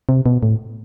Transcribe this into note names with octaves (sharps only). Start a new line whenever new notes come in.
C3
B2
A2